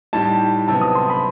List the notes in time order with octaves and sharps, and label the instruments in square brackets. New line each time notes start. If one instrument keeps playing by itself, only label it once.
[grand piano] A2 G3 D#4 G4 [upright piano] A5
[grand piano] C3 F#3 B3 [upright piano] A5
[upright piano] D#6
C6
B5